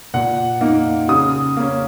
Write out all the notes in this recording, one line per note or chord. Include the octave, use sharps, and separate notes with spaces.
A#2 F#5
A#3 D#4
C#3 D#6
A#3 C#4